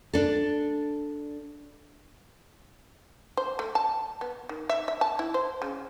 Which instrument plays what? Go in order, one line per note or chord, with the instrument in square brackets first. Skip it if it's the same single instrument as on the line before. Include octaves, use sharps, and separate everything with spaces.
[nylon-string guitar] D4 A4
[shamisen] C5
A3
A5
B3
D#3
E5
E5
A5
E4
C5
C#3